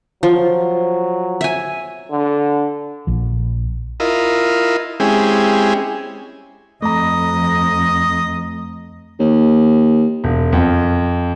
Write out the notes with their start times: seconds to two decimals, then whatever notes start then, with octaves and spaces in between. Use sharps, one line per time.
0.23 F3 F#3
1.41 E5 G#5
2.12 D3
3.07 A#1 F3
4.00 E4 F4 A#4 D#5
5.00 G#3 C4 C#4 E4 G4 G#4
6.82 F2 A3 D#5 A#5
9.19 D#2
10.24 E1
10.53 F2